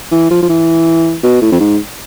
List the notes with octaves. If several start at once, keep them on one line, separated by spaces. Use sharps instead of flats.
E3
F3
F3
E3
B2
A2
F2
G#2